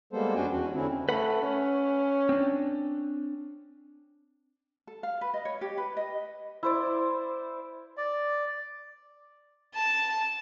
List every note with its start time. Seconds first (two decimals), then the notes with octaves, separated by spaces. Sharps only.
0.13 G3 G#3 A#3 B3 A4 C5
0.35 F2 C#4 D4 F#4 G5 G#5
0.51 E2 F#4
0.74 D3 C4 C#4 E4
1.09 A3 B4 F#5 B5
1.42 C#4
2.29 C4 D4
4.87 A4
5.03 F5
5.21 B4
5.34 D#5
5.45 C#5
5.61 G4
5.77 B4
5.97 D#5
6.63 E4 C5 D5
7.97 D5
9.75 A5